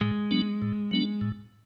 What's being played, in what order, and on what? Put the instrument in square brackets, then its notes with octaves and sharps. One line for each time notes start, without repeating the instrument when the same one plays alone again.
[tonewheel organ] A2 [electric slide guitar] G#3
[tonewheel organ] F#3 B3 D4
A2
F#3 B3 D4
A2